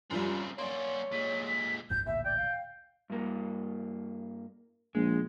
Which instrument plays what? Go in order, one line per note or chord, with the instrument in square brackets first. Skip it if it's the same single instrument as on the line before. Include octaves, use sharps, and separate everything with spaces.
[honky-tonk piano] F#2 F3 G3 [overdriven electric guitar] C#3 C4
[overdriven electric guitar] A#3 C#4 [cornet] C#5 [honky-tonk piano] D5 C6
[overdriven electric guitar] A#2 G#3 [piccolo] B6
[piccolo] B6
[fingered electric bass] F#1 C#2 G#2 [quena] G6
[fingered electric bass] A1 D2 A#2 [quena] E5
[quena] D5 [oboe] G5
[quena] F5
[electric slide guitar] G2 A#3
[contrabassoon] A#1 [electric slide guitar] G#3